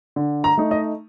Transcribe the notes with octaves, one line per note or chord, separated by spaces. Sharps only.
D3
A#5
A3 D#4
D#5